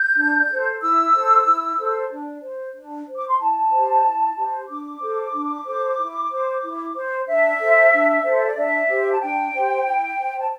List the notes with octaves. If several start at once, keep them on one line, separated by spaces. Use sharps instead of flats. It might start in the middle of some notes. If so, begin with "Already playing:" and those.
Already playing: G6
D4
A4 C5
E4 E6
A4 C5
E4
A4 C5
D4
C5
D4
C5
D6
C6
E4 A5
G4 C5
E4
G4 C5
D4 D6
A4 C5
D4
A4 C5
E4
C5
E4
C5
D4 E5
A4 C5
D4
A4 C5
D5
D4 E5
G4 C5
A5
D4 G5
G4 C5
E4
C5
A5